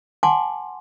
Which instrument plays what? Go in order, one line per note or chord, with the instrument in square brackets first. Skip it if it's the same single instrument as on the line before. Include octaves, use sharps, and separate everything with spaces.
[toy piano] F#5 G#5 A5 C6 D6